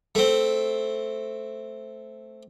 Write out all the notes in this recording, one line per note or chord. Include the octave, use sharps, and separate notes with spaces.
A3 C4